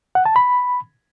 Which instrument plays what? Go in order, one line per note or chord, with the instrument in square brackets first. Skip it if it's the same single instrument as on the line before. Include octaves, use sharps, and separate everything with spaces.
[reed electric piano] F#5
A5
B5